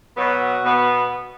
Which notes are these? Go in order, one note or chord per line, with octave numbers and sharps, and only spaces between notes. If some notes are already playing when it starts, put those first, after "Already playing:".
B2 F#3 B3 F#4
B2 B3